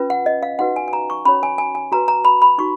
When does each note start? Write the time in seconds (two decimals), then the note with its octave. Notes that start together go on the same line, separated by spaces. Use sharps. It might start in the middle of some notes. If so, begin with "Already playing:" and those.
Already playing: C#4 F4 B4
0.10 F#5
0.26 D#5
0.43 F5
0.59 D#4 F#4 B4 F#5
0.76 G#5
0.88 G#5
0.93 A#5
1.10 C#6
1.25 C#4 F#4 C#5 B5
1.43 G#5
1.58 G#5
1.75 G#5
1.92 F#4 B4 A#5
2.08 A#5
2.25 B5
2.42 B5
2.58 D#4 F#4 C#6